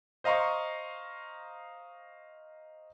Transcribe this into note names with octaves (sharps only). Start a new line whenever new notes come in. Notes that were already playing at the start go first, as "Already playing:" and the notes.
C5 D#5 F5 A#5 C6 C#6